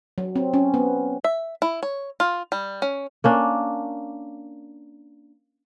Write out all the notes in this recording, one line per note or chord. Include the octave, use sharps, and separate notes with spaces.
F#3
C4
C#4
B3
E5
E4
C#5
F4
G3
C#4
A#3 C#4 D4